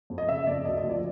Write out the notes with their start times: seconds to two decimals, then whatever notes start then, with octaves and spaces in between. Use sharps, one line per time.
0.10 F2
0.18 D#5
0.29 C#3 E5
0.47 F2 D5
0.65 D2 D#5
0.77 D#5
0.84 F3
0.90 D5